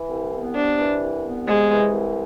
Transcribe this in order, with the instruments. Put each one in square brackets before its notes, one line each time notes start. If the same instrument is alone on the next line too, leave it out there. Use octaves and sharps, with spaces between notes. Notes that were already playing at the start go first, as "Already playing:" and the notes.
Already playing: [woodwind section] E3
C2
B3
[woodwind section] C3 [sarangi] D4
[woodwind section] E3
C2
B3
[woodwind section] C3 [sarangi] G#3
[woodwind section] E3
C2